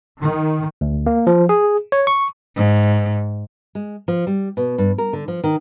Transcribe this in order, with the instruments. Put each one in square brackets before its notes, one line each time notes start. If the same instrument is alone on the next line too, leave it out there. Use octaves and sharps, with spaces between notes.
[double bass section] D#3
[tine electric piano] D2
A#3
F3
G#4
C#5
C#6
[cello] G#2
[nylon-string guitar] G#3
F3
G3
B2
G2
A#4
D3
F3
D#3